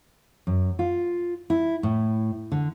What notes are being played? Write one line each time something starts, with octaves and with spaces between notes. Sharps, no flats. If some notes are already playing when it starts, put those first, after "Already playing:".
F#2
F4
E4
A2
D3